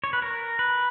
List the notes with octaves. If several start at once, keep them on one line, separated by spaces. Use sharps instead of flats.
C#5
B4
A#4
B4